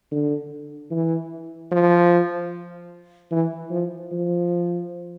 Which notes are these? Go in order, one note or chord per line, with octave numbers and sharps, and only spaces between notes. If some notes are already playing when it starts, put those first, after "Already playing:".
D3
E3
F3
E3
F3
F3